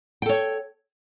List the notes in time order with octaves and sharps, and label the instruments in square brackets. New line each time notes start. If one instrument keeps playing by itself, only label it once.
[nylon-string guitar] G5
A4
C#5